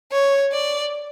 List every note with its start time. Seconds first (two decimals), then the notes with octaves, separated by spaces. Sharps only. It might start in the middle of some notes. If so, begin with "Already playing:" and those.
0.13 C#5
0.53 D5